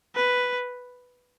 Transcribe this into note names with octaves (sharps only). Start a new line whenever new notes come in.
B4